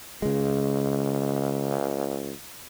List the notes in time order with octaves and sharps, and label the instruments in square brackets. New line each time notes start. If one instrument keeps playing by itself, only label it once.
[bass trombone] C#2 [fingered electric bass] C#3 G#3